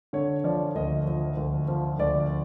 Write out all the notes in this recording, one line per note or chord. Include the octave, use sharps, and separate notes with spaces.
D3 C#5
F3 D5
D2 D#5
F3
D2
F3
D2 D5